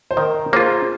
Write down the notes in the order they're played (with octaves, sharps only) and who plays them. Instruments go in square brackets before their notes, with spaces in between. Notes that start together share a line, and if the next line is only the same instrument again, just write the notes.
[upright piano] C5
[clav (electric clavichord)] D#3 [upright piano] A#4 D#5
[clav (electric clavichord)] A#3 F4 [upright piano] G#4 C5